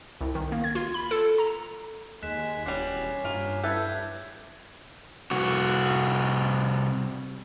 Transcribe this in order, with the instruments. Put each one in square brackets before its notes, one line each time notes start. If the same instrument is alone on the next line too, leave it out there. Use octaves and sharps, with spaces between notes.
[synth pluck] C2
D#3
A#3
G#6
F4
B5
A4
A#5
[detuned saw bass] D#2 [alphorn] G#3 [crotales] F#6 B6 E7
[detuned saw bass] E1 [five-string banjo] G3 F#4 [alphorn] C#4 [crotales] D6 C7
[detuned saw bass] G2 [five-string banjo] A#3 F4
[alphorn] E4 [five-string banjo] A4 B4 E5 [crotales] G6 G#6
[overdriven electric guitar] C2 F#4